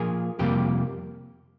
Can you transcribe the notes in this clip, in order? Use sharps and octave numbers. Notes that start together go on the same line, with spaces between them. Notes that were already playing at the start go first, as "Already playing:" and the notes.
Already playing: A#2 F3 A#3 G#4
F2 C3 G3 A#3 G4